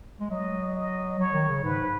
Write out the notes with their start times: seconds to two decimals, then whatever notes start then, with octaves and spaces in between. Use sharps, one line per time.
0.20 G#3
0.30 F#3 D#5
0.75 D#5
1.19 F#3 C#5
1.33 D#3
1.49 C#3
1.63 G#2 B4